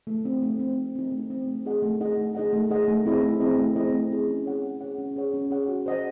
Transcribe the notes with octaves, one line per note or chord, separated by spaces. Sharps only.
A3
C4 D#4
A3
C4 D#4
A3
C4 D#4
A3
C4 D#4
A3
D#4 G#4 D#5 F#5
A3
D#4 G#4 D#5 F#5
A3
D#4 G#4 D#5 F#5
A3
D#4 G#4 D#5 F#5
A3
C4 E4 G#4 D#5
A3
C4 E4 G#4 D#5
A3
C4 E4 G#4 D#5
A3
C4 E4 G#4 D#5
C#4
G#4 C#5 F#5
C#4
G#4 C#5 F#5
C#4
G#4 C#5 F#5
C#4
G#4 C#5 F#5
F#4
C5 D#5 F#5